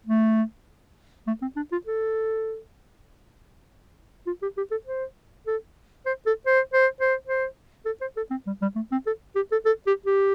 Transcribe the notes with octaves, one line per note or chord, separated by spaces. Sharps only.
A3
A3
C4
D4
F4
A4
F4
G4
G4
A4
C5
A4
C5
A4
C5
C5
C5
C5
A4
C5
A4
C4
G3
G3
A3
C4
A4
G4
A4
A4
G4
G4